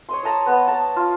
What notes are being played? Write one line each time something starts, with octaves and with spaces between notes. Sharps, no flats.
C#5 D#5 C6
C#5 D#5 A5 A#5
B3
A5 A#5
F4